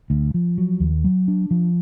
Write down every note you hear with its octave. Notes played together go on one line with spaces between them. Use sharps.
D2
F3
F#3
D#2
F#3
D4
F3